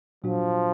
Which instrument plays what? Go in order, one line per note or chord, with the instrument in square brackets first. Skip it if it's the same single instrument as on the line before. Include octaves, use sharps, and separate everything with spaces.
[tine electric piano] A#2 F#3 D4 F#4 [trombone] F3